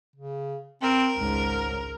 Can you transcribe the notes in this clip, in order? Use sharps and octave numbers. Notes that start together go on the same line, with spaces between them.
C#3
C4 A#4
G#1 C#2 G#2